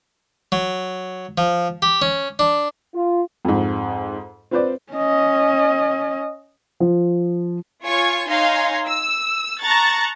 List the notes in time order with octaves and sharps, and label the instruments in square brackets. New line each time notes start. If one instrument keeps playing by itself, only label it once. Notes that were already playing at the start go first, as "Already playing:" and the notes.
[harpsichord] F#3
F3
G4
C#4
D4
[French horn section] F4
[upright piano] F2 G#2
C4 F4 B4 C5 D5
[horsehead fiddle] C#4 D#5
[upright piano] F3
[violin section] F4 C#5 G#5 C#6
D#4 C#5 F5 G#5 A#5 C6
E6
A5 A#5 C#6 F#6 A6